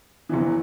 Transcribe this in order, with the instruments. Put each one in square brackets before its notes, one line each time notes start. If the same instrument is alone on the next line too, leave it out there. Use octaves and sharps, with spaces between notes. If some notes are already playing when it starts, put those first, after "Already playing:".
[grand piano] F#1 E2 E3